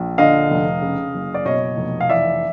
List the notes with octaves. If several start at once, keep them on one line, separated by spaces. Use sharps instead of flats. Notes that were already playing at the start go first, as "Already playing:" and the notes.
Already playing: A#1
D3 D#5 F5
F1
C#3
F#1
D5
B2 C#5 D#5
F1
F5
E3 D5 E5